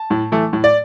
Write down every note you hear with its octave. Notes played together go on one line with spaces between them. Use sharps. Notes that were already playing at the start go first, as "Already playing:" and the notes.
Already playing: A5
A2
E3 A3
A2
D5